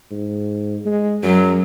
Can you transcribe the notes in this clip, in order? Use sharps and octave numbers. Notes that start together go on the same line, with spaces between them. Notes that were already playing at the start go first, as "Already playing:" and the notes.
G#2
G#3
F#2 F#3